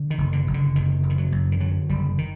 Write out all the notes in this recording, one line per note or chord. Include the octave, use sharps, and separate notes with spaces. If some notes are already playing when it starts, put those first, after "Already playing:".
Already playing: D3
D#3
F#1
D3
F#1
D3
F#1 D#3
F#1
D#3
F#3
F#2
D#3
D3 F#3
F#1 G3
D#3